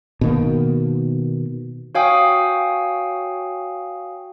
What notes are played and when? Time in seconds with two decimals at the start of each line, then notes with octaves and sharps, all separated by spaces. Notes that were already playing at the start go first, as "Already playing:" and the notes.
0.21 B2 D#3 A#3
1.95 F#4 C#5 F5 G5 G#5 D#6